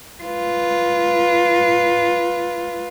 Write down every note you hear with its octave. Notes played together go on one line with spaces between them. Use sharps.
F4 B4